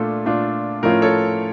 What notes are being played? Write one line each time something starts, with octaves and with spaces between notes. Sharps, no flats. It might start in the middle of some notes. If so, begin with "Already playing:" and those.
Already playing: A#2 A3 D4 F4 A4
A#2 A3 D4 F4
A2 F3 A3 C#4 F4 A#4
A4 C#5